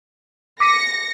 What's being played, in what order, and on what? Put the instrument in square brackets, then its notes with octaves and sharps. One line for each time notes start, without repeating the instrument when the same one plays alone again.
[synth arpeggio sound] D6 B6 D#7 [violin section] A#6 C#7